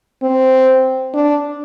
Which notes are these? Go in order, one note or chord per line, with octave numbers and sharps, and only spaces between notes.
C4
D4